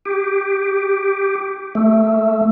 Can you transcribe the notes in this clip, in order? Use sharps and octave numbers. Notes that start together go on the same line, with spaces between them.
G4
A3